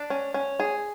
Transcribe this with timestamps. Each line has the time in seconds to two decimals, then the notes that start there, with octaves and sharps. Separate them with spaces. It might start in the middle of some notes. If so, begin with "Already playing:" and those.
Already playing: D4
0.10 C#4
0.34 C#4
0.60 G#4